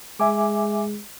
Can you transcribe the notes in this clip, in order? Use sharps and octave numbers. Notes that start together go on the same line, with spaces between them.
G#3 E5 G#5 D6